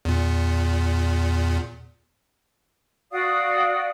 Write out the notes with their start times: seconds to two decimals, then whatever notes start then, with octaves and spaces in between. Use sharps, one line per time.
0.05 E2 A#2
3.11 F#4 D5 F5 D#6